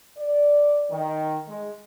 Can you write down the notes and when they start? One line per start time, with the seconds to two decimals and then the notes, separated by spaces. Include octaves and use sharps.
0.17 D5
0.91 D#3
1.48 G#3